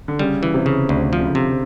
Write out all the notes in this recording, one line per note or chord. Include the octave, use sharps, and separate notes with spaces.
D3
C#3 G3
E3
C3
C#3
D2
F3
C#3
D3
C3